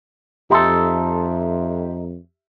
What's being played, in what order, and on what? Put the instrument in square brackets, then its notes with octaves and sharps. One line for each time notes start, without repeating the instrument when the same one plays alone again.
[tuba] F2 [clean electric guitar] D#4 A4 [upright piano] G4 E5 C6